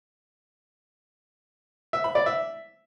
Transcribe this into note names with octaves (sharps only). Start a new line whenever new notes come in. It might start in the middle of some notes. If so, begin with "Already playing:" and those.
E5
B5
D5
E5